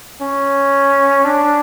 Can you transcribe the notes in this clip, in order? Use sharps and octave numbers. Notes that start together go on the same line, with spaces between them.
C#4
D4